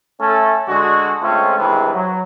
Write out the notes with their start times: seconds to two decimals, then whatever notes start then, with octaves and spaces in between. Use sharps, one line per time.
0.21 A3 C#4 A4
0.68 D3 G#3 F#4
1.23 G#3 A3 C4 C#4 F4
1.59 G#1 G2 C3 E3 G#4 B4
1.94 F#3